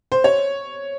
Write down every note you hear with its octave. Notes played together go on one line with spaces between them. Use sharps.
C5
C#5